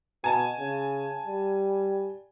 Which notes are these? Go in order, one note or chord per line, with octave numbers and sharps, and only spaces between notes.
B2 G#5 A5
C#3
G3